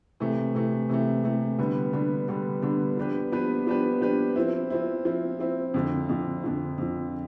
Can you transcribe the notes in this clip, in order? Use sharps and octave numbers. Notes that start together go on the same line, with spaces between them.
C3 E3 A3
C3 E3 A3
C3 E3 A3
C3 E3 A3
D3 G3 B3 D4
D3 G3 B3 D4
D3 G3 B3 D4
D3 G3 B3 D4
F3 B3 D4 G4 B4
F3 B3 D4 G4 B4
F3 B3 D4 G4 B4
F3 B3 D4 G4 B4
F3 C4 E4
F3 C4 E4
F3 C4 E4
F3 C4 E4
F2 D3 F3
F2 D3 F3
F2 D3 F3
F2 D3 F3